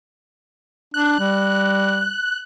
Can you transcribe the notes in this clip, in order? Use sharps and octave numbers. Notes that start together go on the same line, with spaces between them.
D4 F#6
G3